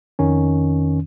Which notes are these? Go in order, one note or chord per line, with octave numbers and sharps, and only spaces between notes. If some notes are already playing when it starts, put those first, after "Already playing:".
F2 D#3 C#4